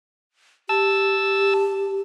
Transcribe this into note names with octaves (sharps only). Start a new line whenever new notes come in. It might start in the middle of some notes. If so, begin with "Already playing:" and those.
G4 A5 E6